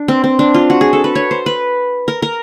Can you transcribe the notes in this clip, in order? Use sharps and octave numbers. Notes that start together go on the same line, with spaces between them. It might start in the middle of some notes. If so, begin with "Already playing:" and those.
Already playing: D4
C4
C4
D4
F4
F#4
G#4
A4
B4
C#5
C5
B4
A#4
A#4